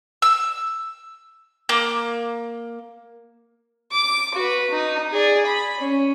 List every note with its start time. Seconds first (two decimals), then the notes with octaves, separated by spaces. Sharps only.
0.22 E6
1.69 A#3
3.92 D6
4.35 F#4 B4
4.71 D#4
5.12 G#4 D5
5.45 B5
5.78 C#4